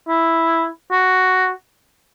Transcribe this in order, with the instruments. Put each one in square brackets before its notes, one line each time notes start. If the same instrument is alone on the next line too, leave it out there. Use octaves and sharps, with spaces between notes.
[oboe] E4
F#4